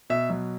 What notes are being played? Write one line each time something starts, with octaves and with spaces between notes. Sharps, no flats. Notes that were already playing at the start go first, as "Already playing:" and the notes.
B2 E5
F#3